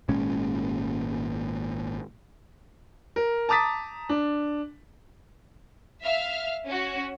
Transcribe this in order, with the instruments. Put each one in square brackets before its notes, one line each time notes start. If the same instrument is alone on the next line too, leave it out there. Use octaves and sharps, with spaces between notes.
[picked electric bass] G#1 A#2 G#3 C#4
[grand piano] A#4
A5 A#5 D6 D#6 A6 B6
D4
[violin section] E5 F5 F6
C#4 F#4